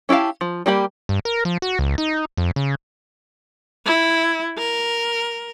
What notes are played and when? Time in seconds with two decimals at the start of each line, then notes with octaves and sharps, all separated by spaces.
0.09 C#4 E4 G4 F5 A5
0.41 F3
0.66 G3 A#3 G4 B5
1.09 G2
1.25 A#4
1.45 F3
1.62 F#4
1.79 C#2
1.98 D#4
2.37 F2
2.56 C#3
3.85 E4
4.58 A#4